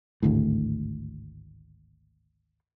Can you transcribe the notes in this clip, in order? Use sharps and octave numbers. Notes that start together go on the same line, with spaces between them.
G#1 D2 A2